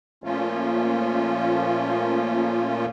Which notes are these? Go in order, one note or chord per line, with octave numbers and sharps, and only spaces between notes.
A#2 F3 A3 A#3 C#4 F4